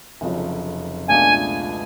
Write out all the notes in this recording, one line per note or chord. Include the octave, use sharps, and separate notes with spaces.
F1 F2 C#3 F#3
C#2 B2 A3 D4 F4 G#5